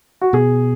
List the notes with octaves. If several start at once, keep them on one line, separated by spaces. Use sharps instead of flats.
F#4
B2 G#4